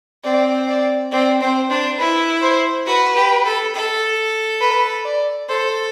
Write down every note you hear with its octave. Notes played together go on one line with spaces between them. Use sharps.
C4 D5
D5
C4 D5
C4 C5
D4 C5
E4 B4
C5
F#4 B4
G4
A4
A4
B4
D5
A4 C5